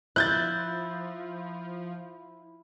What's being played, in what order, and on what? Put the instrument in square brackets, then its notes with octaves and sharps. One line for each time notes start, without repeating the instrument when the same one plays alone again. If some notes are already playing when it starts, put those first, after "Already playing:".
[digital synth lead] F3 [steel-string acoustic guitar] E4 [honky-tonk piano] F#6 G6 A6